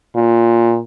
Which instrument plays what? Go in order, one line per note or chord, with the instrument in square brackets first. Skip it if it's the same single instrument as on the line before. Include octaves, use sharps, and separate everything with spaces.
[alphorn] A#2